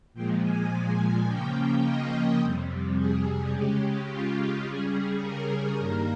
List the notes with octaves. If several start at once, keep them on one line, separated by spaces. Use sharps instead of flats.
A#2 F3 G#3 G5
G#5
C#3 F3 A#3 C#4 G5
D#5
F2 C3 G3
G#4
C#3 G#3 C#4 G4
F4
C#3 G3 C#4 G#4
A#4
G2 D#3 G3 A#3 A#4